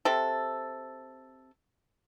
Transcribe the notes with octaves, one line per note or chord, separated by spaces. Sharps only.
C3 A4